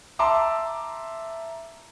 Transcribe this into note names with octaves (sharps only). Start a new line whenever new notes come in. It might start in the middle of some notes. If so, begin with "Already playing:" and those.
E5 A5 A#5 C6 D6 E6